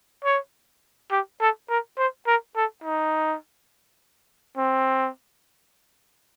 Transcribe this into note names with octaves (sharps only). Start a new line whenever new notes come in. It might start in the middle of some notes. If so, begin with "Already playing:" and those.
C#5
G4
A4
A#4
C5
A#4
A4
D#4
C4